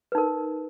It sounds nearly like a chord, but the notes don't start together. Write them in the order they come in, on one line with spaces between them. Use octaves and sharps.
B4 D#4 A#4